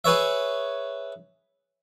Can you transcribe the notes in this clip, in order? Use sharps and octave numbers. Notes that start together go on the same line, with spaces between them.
G#4 B4 C#5 E5